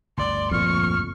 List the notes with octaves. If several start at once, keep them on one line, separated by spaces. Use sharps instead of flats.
G1 D2 D5 C6
F2 A#2 C#6 F6